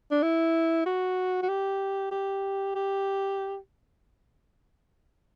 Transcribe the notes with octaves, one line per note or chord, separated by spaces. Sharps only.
D4
E4
F#4
F#4
G4
G4
G4